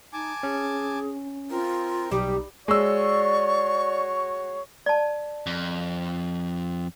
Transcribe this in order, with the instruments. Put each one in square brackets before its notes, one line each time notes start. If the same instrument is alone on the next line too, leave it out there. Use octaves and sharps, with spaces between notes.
[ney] D#4 [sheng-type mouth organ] G#5 A5 D6
[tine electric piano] C#4 [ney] G#4
[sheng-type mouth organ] C4 A#4 [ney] F4
[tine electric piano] B1 [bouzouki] G3 [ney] D#4 [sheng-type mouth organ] G4
[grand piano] G#3 E6 [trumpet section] F#4 C#5 [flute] D5 [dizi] C#6
[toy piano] D5 A5
[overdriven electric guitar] F2